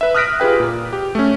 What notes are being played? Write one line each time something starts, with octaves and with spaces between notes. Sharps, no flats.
B4 E5
D#6 F6 F#6 A#6 B6 D7
F4 G4 G#4 B4 G5
A#2
G4
A3 C#4